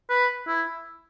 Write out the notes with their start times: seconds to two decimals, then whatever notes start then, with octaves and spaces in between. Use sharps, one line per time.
0.10 B4
0.47 E4